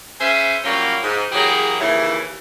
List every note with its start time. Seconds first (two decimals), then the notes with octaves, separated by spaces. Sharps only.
0.20 C#4 G#4 B4 C5 E5
0.64 F#3 G3 A#3 C#4 F4 F#4
1.02 G#2
1.32 E3 F#3 A#3 G4 G#4
1.79 D#2 C#3 E3 E4